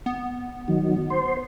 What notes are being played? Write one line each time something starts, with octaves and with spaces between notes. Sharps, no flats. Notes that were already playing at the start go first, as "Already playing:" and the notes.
B3
D#3 F#3
C5